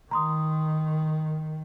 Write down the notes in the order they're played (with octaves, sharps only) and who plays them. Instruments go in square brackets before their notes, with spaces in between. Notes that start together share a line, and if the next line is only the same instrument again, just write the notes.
[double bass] D#3 [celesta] A#5 C6 D#6